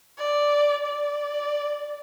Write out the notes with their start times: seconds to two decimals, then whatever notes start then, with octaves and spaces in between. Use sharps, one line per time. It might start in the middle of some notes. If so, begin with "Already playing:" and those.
0.17 D5
0.86 D5